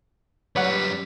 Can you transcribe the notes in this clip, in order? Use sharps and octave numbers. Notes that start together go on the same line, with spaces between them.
F#2 G3 B4 C#5 D5 F#5